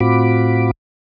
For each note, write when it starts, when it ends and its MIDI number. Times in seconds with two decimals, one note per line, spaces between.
0.01 0.71 45
0.01 0.71 60
0.01 0.71 65
0.01 0.71 66
0.01 0.71 83
0.01 0.71 86